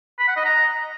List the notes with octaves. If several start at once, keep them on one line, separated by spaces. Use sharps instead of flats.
B5
F#5
D#5
A#5